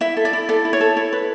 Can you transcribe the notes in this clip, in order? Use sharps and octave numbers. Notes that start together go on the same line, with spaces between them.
E4 E5
A4
D5
E4
A4 D5
E4
C#5
A4
E4 C#5
B4